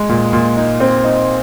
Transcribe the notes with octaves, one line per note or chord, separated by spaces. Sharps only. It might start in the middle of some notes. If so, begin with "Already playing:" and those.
Already playing: G#3
A#2
A#2
D#4
C4
D#4